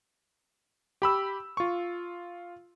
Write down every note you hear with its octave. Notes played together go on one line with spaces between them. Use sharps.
G4 B5 E6
F4 C#6